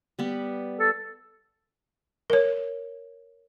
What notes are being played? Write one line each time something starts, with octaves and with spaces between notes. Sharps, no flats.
G3 B3
A4
A#4 C#5